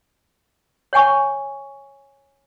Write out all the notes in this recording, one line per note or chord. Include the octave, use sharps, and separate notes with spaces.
C#5 F#5 G#5 C#6